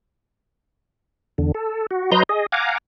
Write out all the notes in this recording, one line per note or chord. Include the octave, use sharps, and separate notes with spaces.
E2 D3
A4
F#4
F#3 B4 D#5 A#5 C6 G6
G#4 D#5
F5 F#5 G#5 A#5 D6